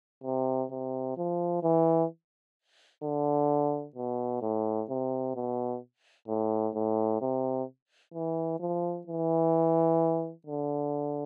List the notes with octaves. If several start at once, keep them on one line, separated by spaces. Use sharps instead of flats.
C3
C3
F3
E3
D3
B2
A2
C3
B2
A2
A2
C3
E3
F3
E3
D3